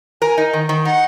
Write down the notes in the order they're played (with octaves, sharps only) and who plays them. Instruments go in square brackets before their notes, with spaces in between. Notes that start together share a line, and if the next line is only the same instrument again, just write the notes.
[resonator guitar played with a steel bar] A#4 [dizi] G#5
[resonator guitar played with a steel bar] D#4
D#3
D#3
[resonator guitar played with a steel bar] D#4 [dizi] F#5